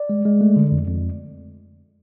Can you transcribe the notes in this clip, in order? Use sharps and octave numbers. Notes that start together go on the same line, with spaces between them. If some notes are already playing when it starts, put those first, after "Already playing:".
Already playing: D5
G#3
G#3
A3
D3
F2
F2